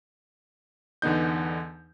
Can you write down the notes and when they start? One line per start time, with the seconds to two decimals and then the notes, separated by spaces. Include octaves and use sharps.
1.02 E2 D3 B3 D#4 G6